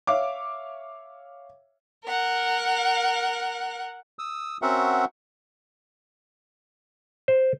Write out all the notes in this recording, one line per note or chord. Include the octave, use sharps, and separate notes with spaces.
C#5 E5 F5 D6
A#4 F#5
D#6 E6
C4 C#4 F#4 A#4 E5 F#5
C5